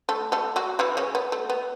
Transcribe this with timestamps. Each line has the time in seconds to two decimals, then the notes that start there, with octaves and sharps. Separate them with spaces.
0.09 A3 A4
0.32 A3 A4
0.56 F#3 F#4
0.79 E3 E4
0.97 C#3 C#4
1.15 B3
1.32 A3
1.50 B3